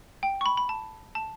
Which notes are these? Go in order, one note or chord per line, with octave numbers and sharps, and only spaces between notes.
G5
C#6
B5
B5
A5
A5